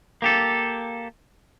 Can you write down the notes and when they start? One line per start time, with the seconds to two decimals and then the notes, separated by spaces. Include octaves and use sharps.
0.22 A#3 G4 A4